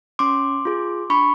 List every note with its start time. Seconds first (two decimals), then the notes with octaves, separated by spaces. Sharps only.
0.19 C#4 C6 D6
0.65 F4 G#4
1.10 D4 B5 C#6